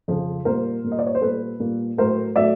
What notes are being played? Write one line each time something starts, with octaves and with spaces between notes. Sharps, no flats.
F2 C#3 F3
A#2 G3 A#3 A#4 C5
A#2 G3 A#3
D#5
D5
C#5
C5
A#2 G3 A#3 A4 B4
A#2 G3 A#3
A2 F#3 A3 A#4 C5
A2 F#3 A3 D5 E5